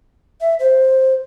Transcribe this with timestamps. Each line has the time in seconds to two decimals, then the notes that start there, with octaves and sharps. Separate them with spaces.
0.40 E5
0.59 C5